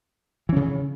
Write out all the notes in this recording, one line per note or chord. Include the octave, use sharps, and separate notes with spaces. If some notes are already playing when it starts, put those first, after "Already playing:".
C#3 E3 C#4